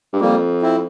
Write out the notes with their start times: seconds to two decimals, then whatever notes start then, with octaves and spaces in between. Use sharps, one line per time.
0.13 G2
0.21 F2 G3 A#3
0.62 C4 E4